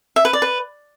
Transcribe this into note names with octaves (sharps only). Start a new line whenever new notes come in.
E5
B4
D5
B4